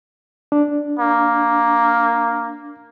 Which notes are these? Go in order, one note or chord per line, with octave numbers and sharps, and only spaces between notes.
D4
A#3